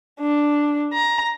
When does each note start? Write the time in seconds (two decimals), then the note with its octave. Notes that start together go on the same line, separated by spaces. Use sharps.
0.21 D4
0.93 A#5